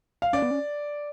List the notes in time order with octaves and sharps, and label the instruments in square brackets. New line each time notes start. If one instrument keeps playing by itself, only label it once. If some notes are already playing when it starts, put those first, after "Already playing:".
[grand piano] F5
[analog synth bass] C#4 [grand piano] D5
[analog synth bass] B3
C#4